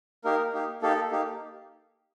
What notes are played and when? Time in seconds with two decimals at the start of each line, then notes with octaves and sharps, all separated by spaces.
0.24 A#3 D#4 G4 A#4
0.54 A#3 D#4 G4
0.82 A#3 D#4 G4 A4
1.12 A#3 D#4 G4